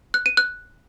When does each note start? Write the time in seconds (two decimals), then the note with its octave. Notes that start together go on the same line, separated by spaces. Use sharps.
0.14 F#6
0.26 D#7
0.37 F#6